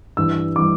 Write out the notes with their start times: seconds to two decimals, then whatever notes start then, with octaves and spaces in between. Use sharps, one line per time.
0.17 G2 E3 G3 E6
0.56 E3 G3 D6